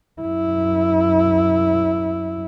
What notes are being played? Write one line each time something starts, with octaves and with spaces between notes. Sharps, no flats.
F#2 E4